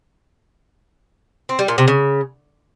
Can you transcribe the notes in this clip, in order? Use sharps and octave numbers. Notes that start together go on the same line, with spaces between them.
C4
G3
A#2
C3
C#3